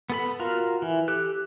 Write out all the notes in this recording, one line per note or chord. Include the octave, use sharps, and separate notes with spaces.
B3 A4 B5
F4 F#4 A#4 F5
E3
G4 A4 F#6